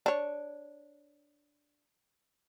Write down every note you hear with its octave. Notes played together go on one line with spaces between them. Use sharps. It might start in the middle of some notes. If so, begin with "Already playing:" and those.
D4 C#5